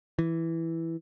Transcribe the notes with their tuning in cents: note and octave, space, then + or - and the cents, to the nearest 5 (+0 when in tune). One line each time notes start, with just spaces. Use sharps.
E3 +0